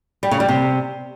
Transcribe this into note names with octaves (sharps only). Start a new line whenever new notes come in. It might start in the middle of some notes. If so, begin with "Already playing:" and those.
G3
C#3
G3
C3